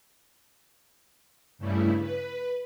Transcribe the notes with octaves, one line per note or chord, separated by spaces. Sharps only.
G2 C#3 G3 A3 E4
B4